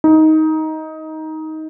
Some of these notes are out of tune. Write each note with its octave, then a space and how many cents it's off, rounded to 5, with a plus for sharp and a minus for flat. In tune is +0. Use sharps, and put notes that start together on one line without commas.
D#4 +15